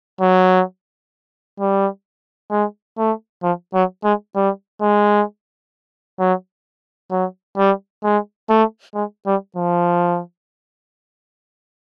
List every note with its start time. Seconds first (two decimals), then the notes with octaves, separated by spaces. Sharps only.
0.21 F#3
1.60 G3
2.51 G#3
2.98 A3
3.43 F3
3.74 F#3
4.04 G#3
4.36 G3
4.82 G#3
6.19 F#3
7.11 F#3
7.57 G3
8.04 G#3
8.49 A3
8.95 G#3
9.27 G3
9.56 F3